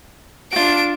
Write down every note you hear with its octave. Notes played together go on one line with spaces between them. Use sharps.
D4 F4 F#4 D7